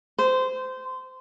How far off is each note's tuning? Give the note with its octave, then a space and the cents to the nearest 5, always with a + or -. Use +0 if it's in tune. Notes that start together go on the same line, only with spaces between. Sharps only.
C5 -20